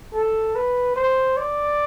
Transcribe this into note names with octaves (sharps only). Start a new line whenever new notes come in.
A4
B4
C5
D5